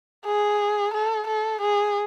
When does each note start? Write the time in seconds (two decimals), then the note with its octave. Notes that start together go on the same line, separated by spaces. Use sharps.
0.25 G#4
0.94 A4
1.28 A4
1.61 G#4